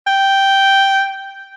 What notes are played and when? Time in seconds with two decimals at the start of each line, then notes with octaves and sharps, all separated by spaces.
0.07 G5